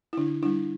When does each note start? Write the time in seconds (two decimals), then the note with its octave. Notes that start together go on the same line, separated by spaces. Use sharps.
0.13 E4
0.17 D3 D4
0.43 G3 D4 E4